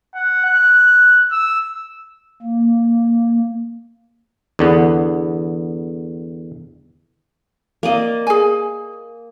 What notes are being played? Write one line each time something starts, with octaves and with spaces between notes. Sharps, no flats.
F#5
F#6
E6
A#3
E2 D3 B3
A#3 D5 D#5
G#4 G#5